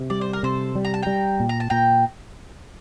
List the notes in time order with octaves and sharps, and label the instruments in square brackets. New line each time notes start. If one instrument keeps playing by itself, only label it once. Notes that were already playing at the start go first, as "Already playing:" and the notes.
Already playing: [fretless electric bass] C3
[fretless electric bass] G3 [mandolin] D5
[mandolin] C5
A#4
[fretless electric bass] C3 [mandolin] A4 C5
[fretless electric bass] G3
[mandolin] A#5
A5
[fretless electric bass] G3 [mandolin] G5 A#5
[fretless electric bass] A#2
[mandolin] A#5
A5
[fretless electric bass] A#2 [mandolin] G5 A#5